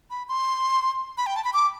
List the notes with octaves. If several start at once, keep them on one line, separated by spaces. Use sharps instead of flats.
B5
C6
B5
G5
A5
B5
D6